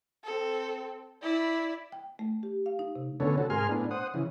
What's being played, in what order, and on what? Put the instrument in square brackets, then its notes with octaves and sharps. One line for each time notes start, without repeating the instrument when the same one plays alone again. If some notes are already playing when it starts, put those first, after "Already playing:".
[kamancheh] C4 A4
E4 D5
[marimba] G5
A3
G4
F5
D#4
C3
[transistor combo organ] D2 D3 B3 C#4 A4 C#5
C3 F#4 A4
G#2 G#4 A#4 G#5 C6 F6
A2 B3 D4
C5 F#5 D#6
C#3 E3